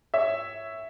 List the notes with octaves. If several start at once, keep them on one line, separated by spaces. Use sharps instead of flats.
C#5 E5